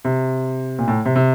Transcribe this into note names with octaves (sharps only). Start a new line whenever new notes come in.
C3
A#2
A2
C3
C3